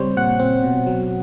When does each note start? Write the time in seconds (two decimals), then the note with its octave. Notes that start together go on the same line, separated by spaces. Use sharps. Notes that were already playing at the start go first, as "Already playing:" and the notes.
Already playing: C#3 G3 C4 C5 C#5
0.17 A#2 F#5
0.39 C4
0.63 B2
0.86 F#3